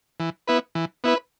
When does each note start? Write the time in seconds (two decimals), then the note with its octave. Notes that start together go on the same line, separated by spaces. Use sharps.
0.20 E3
0.48 B3 E4 B4
0.75 E3
1.04 B3 E4 B4